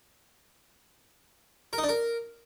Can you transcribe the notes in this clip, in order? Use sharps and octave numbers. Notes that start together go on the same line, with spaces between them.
A#4
D#4
D4
A#4